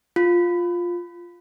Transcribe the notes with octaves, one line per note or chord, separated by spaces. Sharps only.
F4